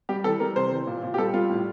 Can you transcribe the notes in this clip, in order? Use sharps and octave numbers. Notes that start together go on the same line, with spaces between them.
G3 G4
E3 A4
G3 A#4
C3 C5
E3
A#2
A#2
G4
G3 A4
G3 F4
A2